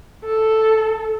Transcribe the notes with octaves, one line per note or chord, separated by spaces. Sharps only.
A4